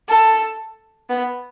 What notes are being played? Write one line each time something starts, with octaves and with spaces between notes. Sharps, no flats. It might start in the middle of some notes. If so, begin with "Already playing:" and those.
A4
B3